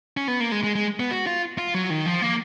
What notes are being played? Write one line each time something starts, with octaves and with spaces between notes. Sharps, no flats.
C#4
B3
A#3
G#3
G#3
G#3
B3
F#4
F4
F4
F#3
D#3
F3
A#3